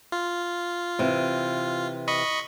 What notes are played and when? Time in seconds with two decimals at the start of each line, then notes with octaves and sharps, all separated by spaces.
0.12 F4
0.99 C3 E3
2.08 D#5 B5 C#6